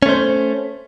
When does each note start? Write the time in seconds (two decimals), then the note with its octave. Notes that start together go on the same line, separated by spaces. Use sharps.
0.02 C#4
0.06 A3
0.09 C5